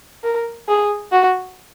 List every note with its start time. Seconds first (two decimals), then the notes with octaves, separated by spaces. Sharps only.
0.24 A#4
0.68 G#4
1.12 F#4